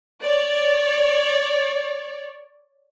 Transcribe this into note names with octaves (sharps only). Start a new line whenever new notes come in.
C#5 D5